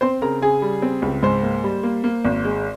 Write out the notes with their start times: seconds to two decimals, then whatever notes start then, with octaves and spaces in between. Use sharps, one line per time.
0.01 C4 C5 C6
0.22 C#3 A#4 A#5
0.41 C#3 G#4 G#5
0.62 G3
0.82 C4
1.02 C#2
1.23 G#2 C5 C6
1.43 A#3
1.64 G3
1.83 A#3
2.04 A#3
2.25 G#1
2.45 G#3